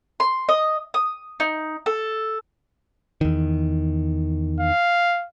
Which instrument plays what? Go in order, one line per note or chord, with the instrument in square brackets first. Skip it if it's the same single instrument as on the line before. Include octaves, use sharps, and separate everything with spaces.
[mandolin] C6
D#5
D#6
D#4
A4
[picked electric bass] E2 D#3
[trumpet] F5